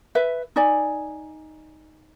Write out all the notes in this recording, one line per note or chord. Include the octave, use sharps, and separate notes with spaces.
B4 E5
D#4 D5 G#5